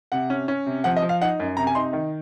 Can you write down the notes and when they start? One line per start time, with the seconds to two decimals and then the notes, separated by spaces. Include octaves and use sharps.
0.12 C3 F#5
0.30 C#4
0.48 C#4
0.66 C3
0.84 F3 F#5
0.97 D#5
1.02 F3
1.09 F5
1.22 D#4 F#5
1.40 F#2
1.57 C3 A#5
1.67 G#5
1.75 D#4 C6
1.93 D#3